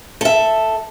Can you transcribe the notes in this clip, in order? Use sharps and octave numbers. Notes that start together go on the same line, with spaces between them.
A4 E5